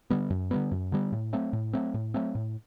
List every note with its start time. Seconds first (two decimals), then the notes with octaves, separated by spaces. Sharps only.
0.10 D3 G3 B3
0.30 F#2
0.51 D3 G3 B3
0.71 F#2
0.92 D3 G3 B3
1.12 A2
1.33 F#3 A3 C4
1.53 A2
1.73 F#3 A3 C4
1.94 A2
2.14 F#3 A3 C4
2.35 A2